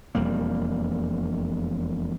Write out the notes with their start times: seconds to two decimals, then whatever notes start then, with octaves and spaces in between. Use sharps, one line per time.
0.15 E1 F2 G3 A#3